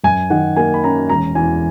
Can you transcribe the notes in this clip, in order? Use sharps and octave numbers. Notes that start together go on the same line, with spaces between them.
F#2 G#5
D#3 F#5
A#3 G#5
B5
C#4 A#5
E1 A#5
E2 G#5